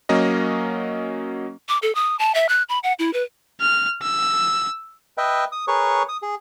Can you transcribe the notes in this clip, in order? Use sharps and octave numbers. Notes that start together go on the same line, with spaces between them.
F#3 A#3 C#4 D#5
D6
A4
D#6
A5
E5
F#6
B5
F#5
E4
B4
F6
E6
B4 D#5 E5 G5
D#6
G#4 A#4 B4 C#5 C#6
D#6
G#4